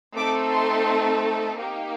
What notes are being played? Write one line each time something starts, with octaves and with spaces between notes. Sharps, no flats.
A3 C4 D#4 A4 D6
C6
A#3 D#4 G4